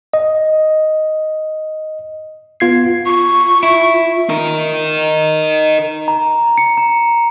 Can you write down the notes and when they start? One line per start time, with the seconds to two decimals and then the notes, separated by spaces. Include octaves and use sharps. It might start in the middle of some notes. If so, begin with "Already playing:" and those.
0.14 D#5
2.60 B3 F4 G#6 C7
3.06 F4 C#6
3.63 E4
4.29 D#4 A#4
6.08 A#5
6.58 C#7
6.77 A#5